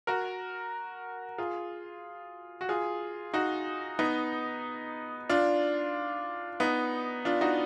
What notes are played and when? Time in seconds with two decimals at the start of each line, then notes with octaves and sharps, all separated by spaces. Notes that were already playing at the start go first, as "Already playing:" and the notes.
0.07 F#4 A#4
1.38 F4 G#4
2.61 F#4
2.69 F4 G#4
3.34 D#4 F#4
3.99 B3 D#4
5.29 D4 F4
6.60 B3 D#4
7.25 D4 F4
7.41 D#4 F#4